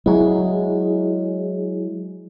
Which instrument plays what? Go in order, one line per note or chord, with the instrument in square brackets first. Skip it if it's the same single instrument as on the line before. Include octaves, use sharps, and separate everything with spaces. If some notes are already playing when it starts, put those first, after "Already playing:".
[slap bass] F#3 G#3 [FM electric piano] E4 G#4